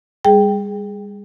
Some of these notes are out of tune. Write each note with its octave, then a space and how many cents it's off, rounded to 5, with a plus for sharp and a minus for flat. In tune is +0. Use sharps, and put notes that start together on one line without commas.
G3 +40 G#4 +0 G5 +0